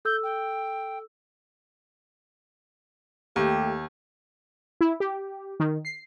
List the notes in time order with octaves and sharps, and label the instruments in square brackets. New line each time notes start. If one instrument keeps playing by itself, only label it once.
[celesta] A4 E6 [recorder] G6
[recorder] G5
[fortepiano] D#2 [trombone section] A3 G4
[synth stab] E4
G4
D#3
C7